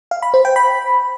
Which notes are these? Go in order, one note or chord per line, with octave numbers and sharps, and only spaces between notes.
F5
B5
C5
G5
B5